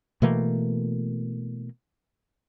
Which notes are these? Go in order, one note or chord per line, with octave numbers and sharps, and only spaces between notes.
B2 E3 A3 A#3